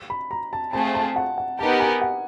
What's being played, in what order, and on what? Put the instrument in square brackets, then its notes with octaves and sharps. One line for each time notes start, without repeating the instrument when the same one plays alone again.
[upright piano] B5
A#5
A5
[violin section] A3 C4 F4 G#4 [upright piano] A5
[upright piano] A5
F#5
F#5
[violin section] B3 D#4 G4 A#4 [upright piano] A5
[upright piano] G#5
F#5